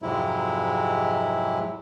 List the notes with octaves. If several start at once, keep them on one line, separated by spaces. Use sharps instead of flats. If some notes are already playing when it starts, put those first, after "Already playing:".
F2 G#2 C3 F#3 G#3 E4